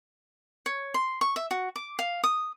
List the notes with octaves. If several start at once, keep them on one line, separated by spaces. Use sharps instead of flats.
C#5
C6
C#6
E5
F#4
D6
F5
D#6